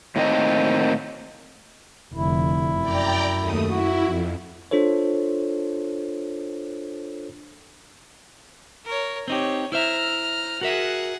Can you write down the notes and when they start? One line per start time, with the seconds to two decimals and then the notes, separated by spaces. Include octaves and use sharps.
0.16 A2 D#3 A#3 C4 D#5
2.14 F1 D3 E4
2.81 F#2 D5 G5 A#5
3.38 D#2 A3 D#6
3.68 E4 F#4
4.04 F2
4.71 D4 F4 A4 C5 C#5
8.85 A#4 C#5
9.28 C4 D#4 G4 C#5
9.72 E4 C5 E5 A#5 F6
10.61 F#4 G#4 A#4 E5 F#5